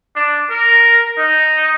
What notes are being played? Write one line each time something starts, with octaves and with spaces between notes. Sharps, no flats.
D4
A#4
D#4